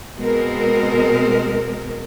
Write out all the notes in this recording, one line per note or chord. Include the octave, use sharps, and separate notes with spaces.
B2 G#3 C4 A#4